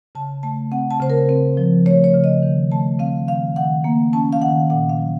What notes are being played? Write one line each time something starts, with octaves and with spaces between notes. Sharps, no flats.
C#3 A5
A3 A5
C4 F#5
A5
C#3 C5
A#4
C4
F3
A3 C#5
C#5
C#3
D#5
D#3
A3 A5
C4 F5
D#3 F5
D#3 F#5
A#3
C#4 A5
F5
D#3 F#5
A#2 F#5
F5
F#3